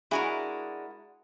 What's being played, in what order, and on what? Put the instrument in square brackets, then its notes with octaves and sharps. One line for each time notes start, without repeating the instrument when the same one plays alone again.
[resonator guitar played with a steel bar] G#3 D4 G#4 [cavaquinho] E4 F#4 A#4